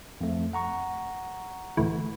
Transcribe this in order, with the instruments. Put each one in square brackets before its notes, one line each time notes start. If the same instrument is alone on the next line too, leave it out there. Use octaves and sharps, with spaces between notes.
[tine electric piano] F2 A3
F#5 A#5 C#6
[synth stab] D2 A2 E3